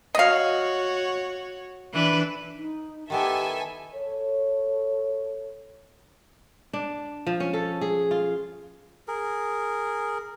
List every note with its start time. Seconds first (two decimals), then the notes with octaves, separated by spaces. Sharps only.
0.15 F#4 C#5 D#5 F5
1.93 E3 D4 B4
2.55 D#4
3.10 D#3 B3 E4 G4 A4 E5 G#5
3.95 A4 C#5
6.73 D4
7.27 F3
7.40 C#4
7.53 A4
7.81 G#4
8.11 F4
9.08 G#4 A#4